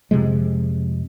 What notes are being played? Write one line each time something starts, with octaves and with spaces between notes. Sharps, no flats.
F2 C3 F3 G#3